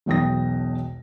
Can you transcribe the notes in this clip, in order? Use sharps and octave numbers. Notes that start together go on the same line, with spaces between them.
E1 B1 B2 G5 D#6 A#6